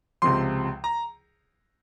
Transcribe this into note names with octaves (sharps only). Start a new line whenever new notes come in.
C#2 C3 F3 C6
A#5